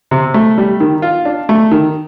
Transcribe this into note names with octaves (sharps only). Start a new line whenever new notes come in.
C3
A3
G3
D#3
F4
D4
A3
D#3